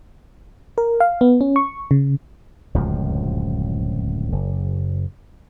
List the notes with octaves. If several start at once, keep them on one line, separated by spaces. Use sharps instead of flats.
A#4
F5
B3
C#4
C#6
C#3
D1 C#2 F#2 F3
F#1